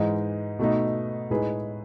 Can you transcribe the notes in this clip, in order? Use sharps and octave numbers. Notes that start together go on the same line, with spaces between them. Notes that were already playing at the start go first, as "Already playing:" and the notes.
Already playing: G#2 E3 G#3 D#4
B2 A3 D#4
A2 G#3 D#4 G#4 B4